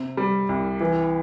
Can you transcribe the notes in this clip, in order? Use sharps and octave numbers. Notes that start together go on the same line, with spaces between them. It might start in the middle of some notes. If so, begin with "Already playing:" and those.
Already playing: C3
G3
C2
E3